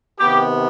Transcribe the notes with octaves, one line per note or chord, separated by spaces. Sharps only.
C3 D#3 B3 G4